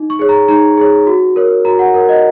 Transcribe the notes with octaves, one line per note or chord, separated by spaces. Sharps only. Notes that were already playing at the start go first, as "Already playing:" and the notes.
Already playing: D#4
C#6
G#4 C#5
A#5
D#4 A#5
G#4 C#5
F#4
A#4 C#5
F#4 A#5
F#5
A#4 C#5
D#5